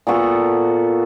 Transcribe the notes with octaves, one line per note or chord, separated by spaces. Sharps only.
A#2 B3 F#4 A4